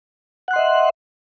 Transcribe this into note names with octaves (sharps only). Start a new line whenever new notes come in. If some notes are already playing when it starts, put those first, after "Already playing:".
D#5 E5 F#5 C6 F#6